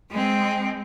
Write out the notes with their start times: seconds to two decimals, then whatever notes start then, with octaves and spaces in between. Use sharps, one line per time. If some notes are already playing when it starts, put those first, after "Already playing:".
0.11 G#3 C4